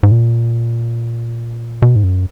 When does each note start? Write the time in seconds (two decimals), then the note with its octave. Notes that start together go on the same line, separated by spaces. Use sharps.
0.03 G#2
0.12 A#2
1.82 B2
1.96 G#2
2.04 F#2